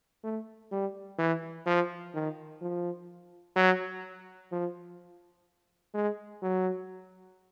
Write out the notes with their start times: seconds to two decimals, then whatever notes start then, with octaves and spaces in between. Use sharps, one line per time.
0.23 A3
0.71 G3
1.18 E3
1.66 F3
2.14 D#3
2.61 F3
3.56 F#3
4.52 F3
5.94 G#3
6.42 F#3